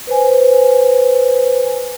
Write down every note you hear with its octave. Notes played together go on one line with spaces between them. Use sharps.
B4 C5 G#5